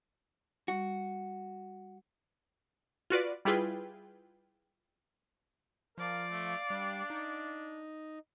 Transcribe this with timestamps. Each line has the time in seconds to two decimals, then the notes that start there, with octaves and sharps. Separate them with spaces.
0.68 G3 F#4
3.10 F4 F#4 B4 D5
3.45 G3 E4 F4 G#4 B4 G5
5.98 F3 A#4 D5 F5
6.31 A3
6.70 G3 D4
7.10 D#4